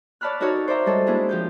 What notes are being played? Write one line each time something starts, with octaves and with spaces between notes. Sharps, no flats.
C#5 D5 A5 B5 F6 F#6
D#4 F#4 A4 A#4 C#5
C5 D5 E5 A#5
G3 G#3 A4 C#5 D#5
G#3 A#3 D4 E4 G#4
F3 G4 G6